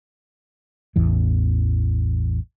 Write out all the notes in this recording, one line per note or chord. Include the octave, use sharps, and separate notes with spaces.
A1 E2 E3